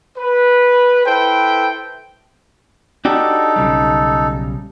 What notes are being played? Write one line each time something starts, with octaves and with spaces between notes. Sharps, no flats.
B4
E4 A4 B4 C5 G5
D4 D#4 F#4 G4 A4
B1 C#3 G3